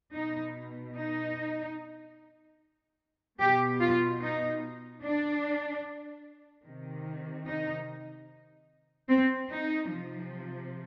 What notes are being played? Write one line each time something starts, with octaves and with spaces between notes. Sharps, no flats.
B2 D#4
D#4
B2 G4
F4
D#4
D4
C3 D#3
D#4
C4
D#4
C3 F3